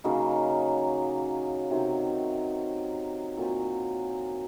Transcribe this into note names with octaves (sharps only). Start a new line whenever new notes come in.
C#3 F#3 A#3 D#4
C3 D#3 F#3 C4
A#2 F#3 C4